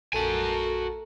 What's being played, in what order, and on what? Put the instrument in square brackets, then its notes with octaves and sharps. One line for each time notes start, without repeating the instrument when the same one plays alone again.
[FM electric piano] A#1 A4 A5 [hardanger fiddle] A3 A#4 [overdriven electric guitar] F#4 G#5